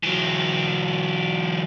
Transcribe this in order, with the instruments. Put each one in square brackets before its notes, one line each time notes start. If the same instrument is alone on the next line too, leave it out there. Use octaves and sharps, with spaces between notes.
[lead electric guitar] E3 F#3